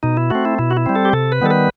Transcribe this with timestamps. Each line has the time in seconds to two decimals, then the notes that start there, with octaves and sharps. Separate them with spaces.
0.03 B2 D#4
0.17 E4
0.30 A3 C4 F#4
0.45 E4
0.59 B2 E4
0.71 F#4
0.77 E4
0.86 G3 C4
0.95 A4
1.05 G4
1.13 C3 A4
1.32 B4
1.41 D#3 G3 B3 A4
1.50 B4